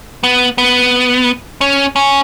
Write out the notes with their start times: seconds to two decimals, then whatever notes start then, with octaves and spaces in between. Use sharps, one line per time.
0.23 B3
0.58 B3
1.61 C#4
1.96 C#4